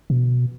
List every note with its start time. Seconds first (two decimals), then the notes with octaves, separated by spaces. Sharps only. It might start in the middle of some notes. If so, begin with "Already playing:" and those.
0.10 B2